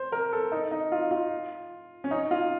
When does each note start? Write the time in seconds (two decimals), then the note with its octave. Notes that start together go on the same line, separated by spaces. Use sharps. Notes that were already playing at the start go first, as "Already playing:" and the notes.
Already playing: C5
0.12 A#4
0.33 A4
0.52 D#4
0.71 D#4
0.92 F4
1.11 F4
2.04 C#4
2.11 D#4
2.31 F4